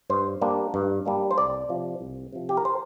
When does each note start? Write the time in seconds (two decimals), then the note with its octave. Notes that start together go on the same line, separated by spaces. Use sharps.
0.10 G2 C5
0.41 G3 A#3 D4
0.74 G2
1.05 G3 A#3 D4
1.31 C5
1.38 C2 D5
1.69 C3 F3
2.01 C2
2.33 C3 F3
2.49 G4
2.57 A#4
2.65 C5